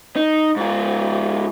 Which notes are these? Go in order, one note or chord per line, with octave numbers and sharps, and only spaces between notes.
D#4
G#2 F4